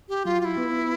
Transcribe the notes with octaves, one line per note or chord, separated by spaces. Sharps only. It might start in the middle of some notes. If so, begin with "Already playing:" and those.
G4
F#3 F4
F4
E4
B3